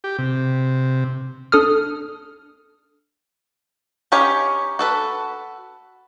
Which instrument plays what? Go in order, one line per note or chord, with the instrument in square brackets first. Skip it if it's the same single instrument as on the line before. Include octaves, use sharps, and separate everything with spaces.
[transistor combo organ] G4
C3
[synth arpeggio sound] D4 A4 D#6 F6
[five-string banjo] C#4 D#4 G4 C#5 F5
F#4 A4 B4